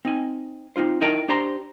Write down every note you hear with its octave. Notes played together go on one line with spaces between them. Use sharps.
C4 D#4 G#5
C4 C#4 D#4 F4 C5
D#4 E4 A#4 D#5 G5 A5
D4 G4 C5 A#5 C6